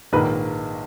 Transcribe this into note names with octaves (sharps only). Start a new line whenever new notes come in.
A#1 G#2 D#3 A#3 B4